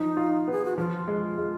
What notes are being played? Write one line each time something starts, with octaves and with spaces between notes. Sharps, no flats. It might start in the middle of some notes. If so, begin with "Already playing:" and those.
Already playing: F3 D#4
F4
B3 G#4
F#4
F3 F4
G#3
G#3